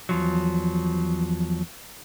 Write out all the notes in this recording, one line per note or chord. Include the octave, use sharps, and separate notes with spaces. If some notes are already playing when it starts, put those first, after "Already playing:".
E2 F3 F#3